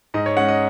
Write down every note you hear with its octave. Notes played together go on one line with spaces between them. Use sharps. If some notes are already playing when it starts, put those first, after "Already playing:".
G#2 D#5
C#5
G#3 C#4 F#5
D#5